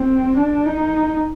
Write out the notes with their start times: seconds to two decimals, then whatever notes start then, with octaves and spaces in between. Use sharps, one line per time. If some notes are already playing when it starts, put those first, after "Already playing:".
Already playing: C4
0.37 D4
0.66 D#4